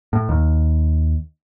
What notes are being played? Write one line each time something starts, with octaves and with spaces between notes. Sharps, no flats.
A2
D#2